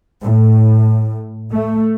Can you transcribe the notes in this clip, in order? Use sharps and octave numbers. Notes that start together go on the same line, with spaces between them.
A2
A3